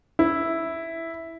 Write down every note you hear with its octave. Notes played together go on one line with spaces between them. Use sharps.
E4